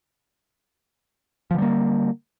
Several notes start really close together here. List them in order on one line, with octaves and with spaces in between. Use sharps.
F3 D3 G3 A#3